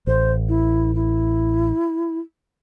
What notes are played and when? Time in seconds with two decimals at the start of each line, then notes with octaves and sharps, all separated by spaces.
0.07 A1 C5
0.49 E4
0.95 E4